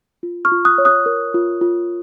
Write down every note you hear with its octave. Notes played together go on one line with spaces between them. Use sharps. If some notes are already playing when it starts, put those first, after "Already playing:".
F4
C#6 F6
F4
D#6 F#6
C#5
D#6 F#6
A#4
F4
F4